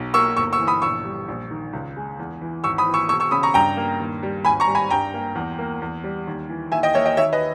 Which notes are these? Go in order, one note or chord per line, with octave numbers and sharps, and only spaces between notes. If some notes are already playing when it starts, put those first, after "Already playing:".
Already playing: B1
A#3 C#6 E6
G1 C#6 E6
C#6 E6
E3
B5 D#6
A#1 C#6 E6
G3
A#1
D#3
C#2
G#3
E2
E3
G#1 C#6 E6
B5 D#6
E3
C#6 E6
E1 C#6 E6
C#6 E6
C#3 B5 D#6
A#5 C#6
G2 G5 A#5
A#3
D#2
G3
G#1 G#5 B5
A#5 C#6
G3
G#5 B5
G2 G5 A#5
A#3
E2
A#3
E2
G3
D#2
E3
D#2 E5 G#5
D#5 G5
A#3 C#5 E5
D#5 G5
D#2 C#5 E5
B4 D#5